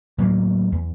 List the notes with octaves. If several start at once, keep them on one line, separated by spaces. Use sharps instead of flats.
A2 F#3 G#3 A#3
E2